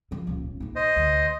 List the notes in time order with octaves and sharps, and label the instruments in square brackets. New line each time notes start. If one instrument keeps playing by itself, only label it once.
[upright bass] C#3 F3
D#1 C#2
A#1 D#4
[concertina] C5 D#5
[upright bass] D2